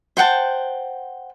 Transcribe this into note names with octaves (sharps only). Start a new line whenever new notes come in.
C5 F#5 G5 A5